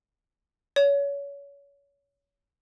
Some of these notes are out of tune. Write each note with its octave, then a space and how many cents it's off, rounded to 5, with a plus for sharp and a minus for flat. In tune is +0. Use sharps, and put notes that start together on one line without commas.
C#5 +30